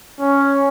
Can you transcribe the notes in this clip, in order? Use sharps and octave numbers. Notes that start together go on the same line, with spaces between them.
C#4